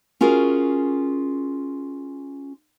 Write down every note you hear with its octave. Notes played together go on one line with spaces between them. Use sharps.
C#4 F4 F#4 G#4 A#4